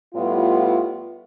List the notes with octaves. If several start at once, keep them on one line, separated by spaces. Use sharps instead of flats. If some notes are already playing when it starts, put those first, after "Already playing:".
A2 G3 B3 F4